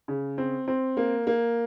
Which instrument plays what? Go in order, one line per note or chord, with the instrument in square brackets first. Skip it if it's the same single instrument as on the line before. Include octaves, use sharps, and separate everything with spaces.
[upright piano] C#3
C4
C4
A#3
A#3